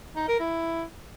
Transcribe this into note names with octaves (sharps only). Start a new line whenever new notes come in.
D#4
A#4
E4